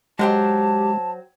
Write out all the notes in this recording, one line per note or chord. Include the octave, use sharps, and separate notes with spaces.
F#3 G#3 G4 C5 G5 A5